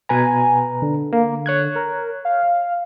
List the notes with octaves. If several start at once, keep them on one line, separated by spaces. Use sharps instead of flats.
B2 B4 G#5 A#5
D3
A#3
C#5 F#6 G#6
A#4
F5